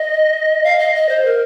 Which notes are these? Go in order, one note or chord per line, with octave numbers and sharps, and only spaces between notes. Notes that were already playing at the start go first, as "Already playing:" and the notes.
Already playing: D#5
F5
D#5
D#5
C5
A#4